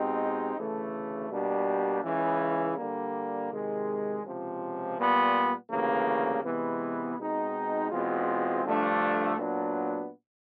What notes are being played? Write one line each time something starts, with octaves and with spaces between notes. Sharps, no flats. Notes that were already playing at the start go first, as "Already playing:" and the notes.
Already playing: B2 G#3 C4 D#4 G4
D2 C#3 E3 A3
B2 G3 A#3 D4 G4
C#2 C#3 E3
D3 G3 A#3
C3 D#3 G#3
C#2 C3 F3
A#2 G3 B3
D2 C#3 E3 G3 A#3
C3 E3 G#3 B3
B2 G#3 C4 D#4
E2 B2 G#3 C4 F4
G2 D3 F3 A3 D4
A#2 F#3 B3 D4